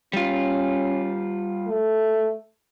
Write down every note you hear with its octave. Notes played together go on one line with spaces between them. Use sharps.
G3 C#4 F4
A3